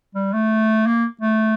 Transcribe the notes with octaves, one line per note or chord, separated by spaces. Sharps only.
G3
A3
A#3
A3